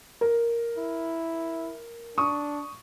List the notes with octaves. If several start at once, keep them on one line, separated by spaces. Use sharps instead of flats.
A#4
E4
D4 C#6 D#6